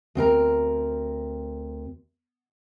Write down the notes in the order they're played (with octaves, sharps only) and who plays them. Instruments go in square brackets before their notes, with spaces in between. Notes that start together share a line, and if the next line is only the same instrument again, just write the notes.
[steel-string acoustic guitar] D2 C4 A#4 A#5